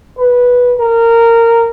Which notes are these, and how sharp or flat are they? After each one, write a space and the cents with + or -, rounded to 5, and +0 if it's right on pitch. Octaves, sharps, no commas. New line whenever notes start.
B4 -10
A#4 -15